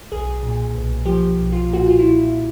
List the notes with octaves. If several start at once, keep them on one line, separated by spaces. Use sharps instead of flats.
B1 G#4
A#2
B1
F3 G4
B1
F4
A#2
F#4
F4
E4